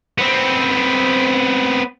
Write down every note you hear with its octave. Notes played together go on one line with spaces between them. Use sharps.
B3 C4